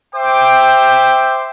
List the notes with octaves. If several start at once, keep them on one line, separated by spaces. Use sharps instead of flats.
C5 E5 G5 D6